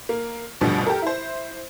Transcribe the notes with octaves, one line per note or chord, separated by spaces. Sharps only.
A#3
A1 D2 G2 B2 F3 G3
G4 A4 A#4
E4 C5